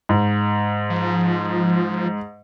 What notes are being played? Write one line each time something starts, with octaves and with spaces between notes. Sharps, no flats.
G#2
F3